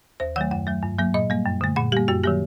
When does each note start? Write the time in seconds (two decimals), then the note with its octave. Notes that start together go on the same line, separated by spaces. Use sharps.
0.20 D#2 C5
0.36 D#3 F#3 A3 F#5
0.51 F#2 F#5
0.67 F#3 A3
0.83 G2
0.99 F#3 A#3
1.14 A#2 D#5
1.30 G3 A#3
1.46 F#2
1.61 D3 A3
1.76 A#2 F#5
1.92 G3 A#3 G4
2.08 F#2 F#4
2.24 D#3 F#3 A#3 G4